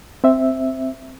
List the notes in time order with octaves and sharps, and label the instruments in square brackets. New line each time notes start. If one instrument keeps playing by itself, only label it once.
[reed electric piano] C4 E5